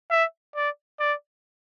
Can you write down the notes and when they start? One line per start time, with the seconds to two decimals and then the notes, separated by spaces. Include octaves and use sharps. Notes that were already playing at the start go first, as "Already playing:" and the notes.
0.11 E5
0.56 D5
1.00 D5